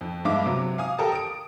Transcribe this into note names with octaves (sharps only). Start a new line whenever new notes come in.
F2
G2 G#3 E5 F5 D6
C3 F#3
F5 G#5 D#6
G4 A4 A#4 A5
D#6 D7